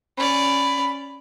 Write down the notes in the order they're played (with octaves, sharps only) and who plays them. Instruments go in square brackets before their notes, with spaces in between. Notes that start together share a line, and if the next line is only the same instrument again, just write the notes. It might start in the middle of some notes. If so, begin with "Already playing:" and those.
[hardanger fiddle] C#4 D5 [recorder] B5